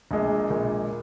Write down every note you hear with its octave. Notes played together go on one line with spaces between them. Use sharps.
A#1 A#2 G#3
A#1 A#2 G#3